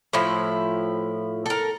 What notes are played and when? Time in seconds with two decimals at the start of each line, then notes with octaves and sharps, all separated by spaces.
0.13 A2 F3 E4
1.46 A4 A#4